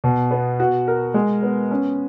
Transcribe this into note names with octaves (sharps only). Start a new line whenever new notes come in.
B2
B3
F#4
A#4
G#3
B3
C#4